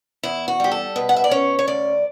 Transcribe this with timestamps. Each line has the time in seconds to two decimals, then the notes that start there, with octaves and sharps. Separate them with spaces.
0.23 E2 E4
0.48 F#4
0.60 G3 G4
0.72 A4
0.96 B2 B4
1.09 F#5
1.17 E5
1.24 D5
1.31 C#4 C#5
1.59 C#5
1.68 D2 D5